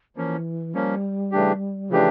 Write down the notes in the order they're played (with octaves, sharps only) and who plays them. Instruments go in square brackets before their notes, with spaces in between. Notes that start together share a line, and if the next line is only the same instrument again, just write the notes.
[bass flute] E3 [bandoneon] F3 A#3 C#4
[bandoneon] F3 A#3 C#4 [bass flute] G3
[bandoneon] C#3 E3 A3 D4 G4
[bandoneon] C#3 E3 A3 D4 G4 [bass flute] F3